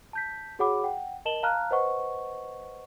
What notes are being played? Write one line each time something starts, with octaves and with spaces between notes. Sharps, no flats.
A5 G6 B6
F#4 G#4 C#5 F#5 B5 D6
F#5 G5
A#4 D#5 A5 E7 F#7 G7
F5 A5 A#5 F6 F#6
B4 C5 D#5 F#5 C#6